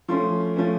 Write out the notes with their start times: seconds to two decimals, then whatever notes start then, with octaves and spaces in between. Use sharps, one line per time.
0.08 F3 A3 C#4 C6
0.56 F3 A3 C#4